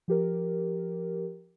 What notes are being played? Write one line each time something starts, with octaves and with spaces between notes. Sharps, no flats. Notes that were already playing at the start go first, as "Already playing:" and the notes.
F3 G4 A#4